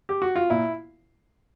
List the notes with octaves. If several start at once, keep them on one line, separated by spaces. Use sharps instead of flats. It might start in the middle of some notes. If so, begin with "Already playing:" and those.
G4
F#4
F4
A#2 E4